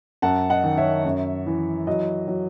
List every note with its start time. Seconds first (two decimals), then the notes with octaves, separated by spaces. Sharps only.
0.22 F#2 F#5 A5
0.50 D#5 F#5
0.64 D#3
0.77 C#5 E5
1.05 F#2
1.46 E3
1.87 F#3 D#5
2.28 F#3